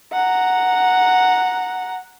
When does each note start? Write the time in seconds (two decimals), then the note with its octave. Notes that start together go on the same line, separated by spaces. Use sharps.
0.12 F#5 A#5